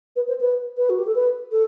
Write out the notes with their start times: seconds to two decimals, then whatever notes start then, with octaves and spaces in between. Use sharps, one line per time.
0.16 B4
0.29 C5
0.41 B4
0.77 B4
0.90 F#4
0.99 G4
1.07 A4
1.15 B4
1.52 A4